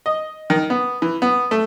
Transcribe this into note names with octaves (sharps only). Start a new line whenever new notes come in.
D#5
D#3
B3
E3
B3
A3